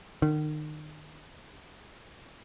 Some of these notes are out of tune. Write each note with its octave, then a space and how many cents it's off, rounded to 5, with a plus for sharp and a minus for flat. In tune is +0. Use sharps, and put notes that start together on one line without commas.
D#3 -35